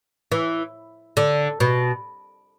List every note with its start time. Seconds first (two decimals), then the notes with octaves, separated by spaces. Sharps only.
0.32 E3
1.17 D3
1.60 B2